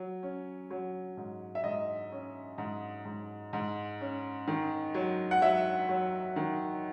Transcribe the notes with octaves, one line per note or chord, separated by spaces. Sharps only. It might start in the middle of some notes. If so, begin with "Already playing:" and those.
Already playing: F#3
C#4
F#3
G#2
E5
G#2 D#5
C#4
G#2
G#2
G#2
C#4
D#3
F#3
F#5
F#3 E5
F#3
D#3